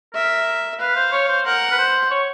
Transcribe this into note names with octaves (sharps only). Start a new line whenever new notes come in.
A#4 E5
B4 F5
C5
C#5
C5
A#4 F#5
B4
C5
C#5